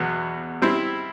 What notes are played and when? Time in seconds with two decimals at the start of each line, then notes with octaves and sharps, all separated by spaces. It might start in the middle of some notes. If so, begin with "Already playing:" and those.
Already playing: E2 B2 F#3 B3
0.62 G3 C4 E4